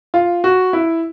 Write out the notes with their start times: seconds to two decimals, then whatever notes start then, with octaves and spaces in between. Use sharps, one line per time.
0.14 F4
0.44 F#4
0.73 E4